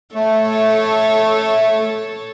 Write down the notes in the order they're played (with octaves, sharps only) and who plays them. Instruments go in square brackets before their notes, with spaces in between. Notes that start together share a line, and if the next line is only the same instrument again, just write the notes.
[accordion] A3 [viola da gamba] A4 C#5